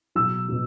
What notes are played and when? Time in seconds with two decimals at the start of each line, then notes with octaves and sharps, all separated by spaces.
0.15 B2 F#3 E6
0.49 B2 F#3